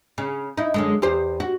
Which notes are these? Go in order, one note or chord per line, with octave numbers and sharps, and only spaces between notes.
C#3
D#4 E4
F#2 D3 G#3
E2 G4 C5
F#4